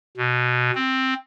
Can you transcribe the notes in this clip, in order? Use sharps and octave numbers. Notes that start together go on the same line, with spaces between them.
B2
C4